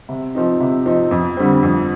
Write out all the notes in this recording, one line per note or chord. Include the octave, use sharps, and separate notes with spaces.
C3
F3 C4 D#4
C3
F3 C4 D#4
F2
D3 G3 C4
F2